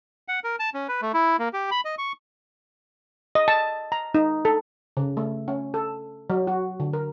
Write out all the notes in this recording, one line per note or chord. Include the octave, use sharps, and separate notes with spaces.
F#5
A#4
A5
C#4
B4
A3
E4
A#3
G4
B5
D#5
C#6
D#5
A5
A#5
D#4
A4
C#3
A3
C#4
A4
F#3
F#4
D3
A#4